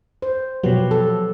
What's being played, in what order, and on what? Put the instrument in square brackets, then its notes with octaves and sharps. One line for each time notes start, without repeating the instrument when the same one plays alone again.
[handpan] C5
[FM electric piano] B2 F3 F#3 [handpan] G4 B4 C#5
[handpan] A4